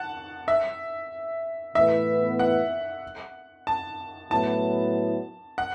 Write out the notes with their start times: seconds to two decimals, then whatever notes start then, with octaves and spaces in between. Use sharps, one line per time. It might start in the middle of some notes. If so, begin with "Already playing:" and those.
Already playing: F#5 A5
0.48 E5
1.75 A2 E3 B3 E4 E5
2.39 F#5
3.67 A5
4.31 A2 F#3 B3 E4 A5
5.58 F#5